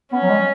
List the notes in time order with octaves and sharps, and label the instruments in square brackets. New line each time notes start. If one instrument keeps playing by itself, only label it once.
[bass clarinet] B3 [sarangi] C#4
[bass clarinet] F#3
G#3